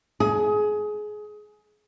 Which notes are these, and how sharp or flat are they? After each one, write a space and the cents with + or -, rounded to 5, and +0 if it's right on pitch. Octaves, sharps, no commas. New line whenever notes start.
G#4 +20